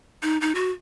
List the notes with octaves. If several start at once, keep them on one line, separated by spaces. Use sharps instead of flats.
D#4
D#4
F#4